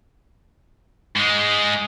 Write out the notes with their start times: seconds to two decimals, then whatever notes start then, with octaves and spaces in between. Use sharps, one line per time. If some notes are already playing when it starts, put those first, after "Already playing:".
1.16 G#2 G#3